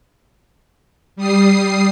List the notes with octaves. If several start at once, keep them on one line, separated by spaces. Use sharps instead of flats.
G3 D#6 C7